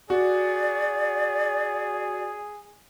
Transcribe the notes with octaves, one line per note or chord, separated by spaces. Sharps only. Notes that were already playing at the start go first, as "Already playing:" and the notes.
F#4 G#4 D5